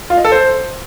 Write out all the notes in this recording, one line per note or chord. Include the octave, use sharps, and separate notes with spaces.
F4
D#5
A4
C5